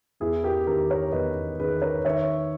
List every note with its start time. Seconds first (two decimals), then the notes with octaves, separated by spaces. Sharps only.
0.20 E2 E4 G#4
0.43 G4 A#4
0.67 D#3 G4 A#4
0.90 A#4 C#5
1.12 E2 B4 D#5
1.59 D#3 G#4 B4
1.82 A#4 C#5
2.05 D#3 C#5 E5